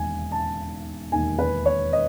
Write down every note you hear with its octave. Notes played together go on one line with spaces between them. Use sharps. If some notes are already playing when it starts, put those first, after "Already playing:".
Already playing: E1 D#2 D#3 G#5
A5
E1 D#2 D#3 G#5
B4
C#5
D#5